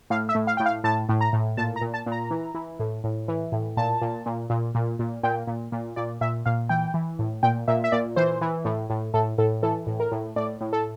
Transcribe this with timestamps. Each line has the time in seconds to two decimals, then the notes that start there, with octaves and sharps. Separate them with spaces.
0.10 A2 F5
0.29 E5
0.35 A2
0.47 F5
0.57 A2 G5
0.66 F5
0.84 A2 A5
1.09 A2
1.21 A#5
1.33 A2
1.57 A#2 A5
1.76 A#5
1.81 A#2
1.94 A5
2.06 A#2
2.12 A#5
2.31 E3
2.55 E3
2.79 A2
3.04 A2
3.28 E3
3.52 A2
3.77 A#2 A5
4.02 A#2
4.26 A#2
4.50 A#2
4.75 A#2
4.99 A#2
5.23 A#2 G5
5.47 A#2
5.72 A#2
5.96 A#2 D5
6.21 A#2 E5
6.46 A#2 F5
6.69 E3 G5
6.94 E3
7.19 A2
7.43 A#2 G5
7.68 A#2 E5
7.84 E5
7.92 A#2 D5
8.16 E3 C5
8.41 E3
8.65 A2
8.90 A2
9.14 A2 A4
9.38 A2 A4
9.63 E3 A4
9.87 A2
10.00 A#4
10.12 A2
10.36 A2 D5
10.61 A2
10.73 A4